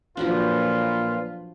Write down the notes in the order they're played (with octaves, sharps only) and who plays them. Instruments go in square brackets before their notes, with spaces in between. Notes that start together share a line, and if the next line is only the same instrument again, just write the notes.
[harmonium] A#2 B4 [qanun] F3 F#3 D4 [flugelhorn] F4